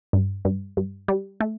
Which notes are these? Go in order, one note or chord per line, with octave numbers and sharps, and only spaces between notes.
G2
G2
G2
G3
A3